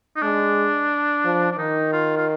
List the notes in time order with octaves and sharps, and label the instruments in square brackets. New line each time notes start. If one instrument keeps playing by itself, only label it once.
[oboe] D#4
[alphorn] G#3 [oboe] D4
[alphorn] F3
[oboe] D4
[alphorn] D#3 [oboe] D#4
[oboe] F4
F4